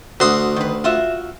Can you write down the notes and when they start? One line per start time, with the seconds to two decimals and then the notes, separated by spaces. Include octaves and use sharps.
0.20 D2 F#4 C6 D#6
0.56 D#3 B4
0.84 F4 F#4 E5